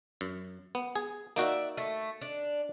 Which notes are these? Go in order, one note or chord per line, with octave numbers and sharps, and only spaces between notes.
F#2
B3
G#4
A#3 D#4 F#4 D5 E5
A3
D4